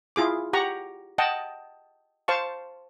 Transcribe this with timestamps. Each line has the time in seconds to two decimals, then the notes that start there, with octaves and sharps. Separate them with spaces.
0.16 E4 F4 G#4 D6
0.53 G4 F#5 A#5 C#6
1.18 D#5 F#5 G5 A5
2.28 C5 F5 A5 C#6